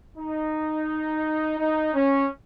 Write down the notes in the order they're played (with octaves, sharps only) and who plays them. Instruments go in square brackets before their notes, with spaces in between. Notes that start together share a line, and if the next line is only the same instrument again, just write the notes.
[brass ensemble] D#4
D#4
C#4